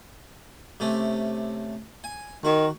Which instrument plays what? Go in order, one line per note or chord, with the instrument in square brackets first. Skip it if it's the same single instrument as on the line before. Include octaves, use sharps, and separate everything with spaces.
[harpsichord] C3 A3 C#4
G#5
[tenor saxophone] D#3 [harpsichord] F#4